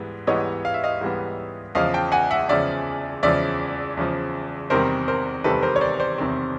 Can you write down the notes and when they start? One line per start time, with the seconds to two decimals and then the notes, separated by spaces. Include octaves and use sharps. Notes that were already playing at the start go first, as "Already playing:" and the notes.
Already playing: G#2 E3 G3 B3
0.27 G#2 E3 G3 B3 C#5 D#5
0.65 F5
0.74 E5
0.84 D#5 F5
1.01 G#2 E3 G3 B3
1.75 E2 C#3 F3 D#5 F5
1.94 G5 A5
2.12 F#5 G#5
2.31 E5 F#5
2.48 E2 C#3 F3 D5 E5
3.23 E2 C#3 F3 D5 E5
3.97 E2 C#3 F3
4.70 E2 C3 D#3 G3 C4 A#4 C5
5.08 A#4 C5
5.44 E2 C3 D#3 G3 C4 A4 B4
5.62 A#4 C5
5.76 C#5
5.81 C5 D5
6.00 C5 D5
6.18 E2 C3 D#3 G3 C4